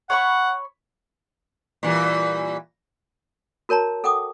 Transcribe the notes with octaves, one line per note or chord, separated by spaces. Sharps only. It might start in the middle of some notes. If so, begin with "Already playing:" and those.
C#5 F#5 B5 C#6
A#2 E3 G3
F#4 A#4 C#5 A5 A#5
A4 F#5 G5 D6 D#6